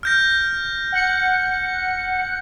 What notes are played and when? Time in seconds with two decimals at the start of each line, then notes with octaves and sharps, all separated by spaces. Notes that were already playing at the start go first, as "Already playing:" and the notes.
0.03 F6 G6 A#6
0.92 F#5 C#7